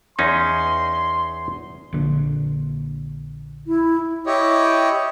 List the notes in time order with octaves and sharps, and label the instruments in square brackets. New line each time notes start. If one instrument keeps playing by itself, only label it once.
[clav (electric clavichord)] E2 C#4 D#4 [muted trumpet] C6
[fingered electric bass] A#1 D3
[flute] E4
[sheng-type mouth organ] E4 G4 C#5 D#5